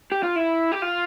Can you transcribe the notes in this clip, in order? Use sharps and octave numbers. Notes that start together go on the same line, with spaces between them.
G4
F4
E4
G4
F4